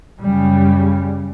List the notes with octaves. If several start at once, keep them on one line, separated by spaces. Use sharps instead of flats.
F#2 C#3 G3